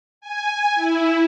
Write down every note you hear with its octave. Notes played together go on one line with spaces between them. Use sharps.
G#5
E4